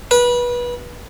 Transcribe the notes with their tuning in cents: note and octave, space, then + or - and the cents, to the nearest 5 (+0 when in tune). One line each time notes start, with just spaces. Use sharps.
B4 -25